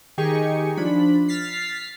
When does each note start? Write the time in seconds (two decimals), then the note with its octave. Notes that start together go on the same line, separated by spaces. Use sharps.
0.18 D#3 D#4 G4 G#4 G#5 C#6
0.77 F3 D4 B5
1.29 F6 A6 B6 C7